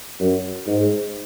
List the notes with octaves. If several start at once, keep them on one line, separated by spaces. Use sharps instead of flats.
F#2
G#2